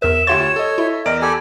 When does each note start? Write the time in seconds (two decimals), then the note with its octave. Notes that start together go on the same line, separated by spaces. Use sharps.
0.02 E2 A#4 E5 E7
0.27 D2 F4 G4 C#5 E5 C6 A6
0.56 A4 D#5 G#6
0.78 E4 E5
1.06 E2 A#4 D5 D#5 D7
1.22 G4 A4 G#5 B5